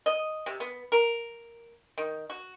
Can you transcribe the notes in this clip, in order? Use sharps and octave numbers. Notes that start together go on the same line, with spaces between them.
D#5
C3
B3
A#4
D#3
F#4